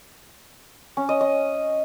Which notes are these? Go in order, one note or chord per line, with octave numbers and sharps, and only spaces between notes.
C#4
D#5
D#5